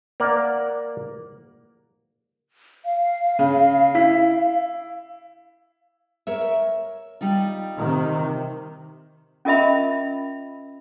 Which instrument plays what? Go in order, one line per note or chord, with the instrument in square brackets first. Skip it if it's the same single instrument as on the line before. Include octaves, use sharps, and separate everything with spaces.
[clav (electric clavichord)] A#3 A#4 D5 F#5
[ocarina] F5
[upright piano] C#3
E4 B6
[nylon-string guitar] A#4 C#5 E5
G3 D#4 F4
[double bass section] C3 D#3
[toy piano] C#4 F4 A#4 D#5 E5 B5